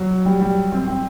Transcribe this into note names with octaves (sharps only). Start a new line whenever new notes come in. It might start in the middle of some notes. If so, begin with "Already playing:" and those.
Already playing: F#3
G3
G3
C4
C4